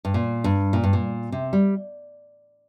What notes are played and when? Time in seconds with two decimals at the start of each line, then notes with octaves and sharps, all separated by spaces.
0.05 G2
0.14 A#2
0.44 G2
0.73 A#2
0.84 G2
0.93 A#2
1.32 C3
1.53 G3